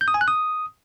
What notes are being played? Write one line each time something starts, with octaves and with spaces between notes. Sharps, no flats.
G6
D#6
G#5
F#6
D#6